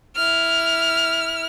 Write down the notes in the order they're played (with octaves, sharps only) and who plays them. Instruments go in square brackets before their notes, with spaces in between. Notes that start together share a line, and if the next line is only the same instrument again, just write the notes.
[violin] E4 F6